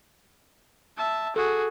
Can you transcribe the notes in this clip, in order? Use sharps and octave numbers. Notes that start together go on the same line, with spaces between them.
E5 A5
F#4 G#4 A4